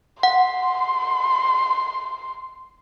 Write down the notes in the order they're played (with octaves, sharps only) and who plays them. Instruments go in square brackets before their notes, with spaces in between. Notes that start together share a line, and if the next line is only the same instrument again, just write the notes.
[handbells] F#5 [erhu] C6